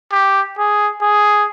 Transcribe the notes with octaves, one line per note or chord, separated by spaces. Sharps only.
G4
G#4
G#4